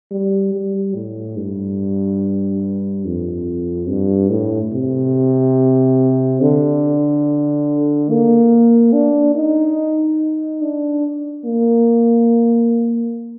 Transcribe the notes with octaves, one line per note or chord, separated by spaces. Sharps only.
G3
G3
A2
G2
F2
G2
A2
C3
D3
A#3
D4
D#4
D4
A#3